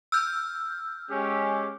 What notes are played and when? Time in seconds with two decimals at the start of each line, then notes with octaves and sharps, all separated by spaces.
0.12 E6 F6 G6
1.11 G#3 C#4 G4